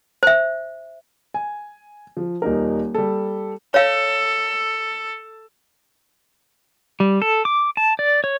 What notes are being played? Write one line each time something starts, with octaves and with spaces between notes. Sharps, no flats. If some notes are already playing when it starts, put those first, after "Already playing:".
C5 E5
G#5
F3
D#1 D#4 A#4
G3 A4
A4 C#5 F5
G3
A4
D6
A5
D5
C#5